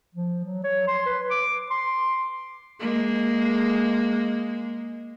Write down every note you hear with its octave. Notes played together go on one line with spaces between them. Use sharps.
F3
F#3
C#5
C6
B4
D6
C6
G#3 A#3